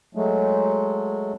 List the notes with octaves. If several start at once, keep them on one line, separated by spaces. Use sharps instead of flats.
F#3 G#3 A3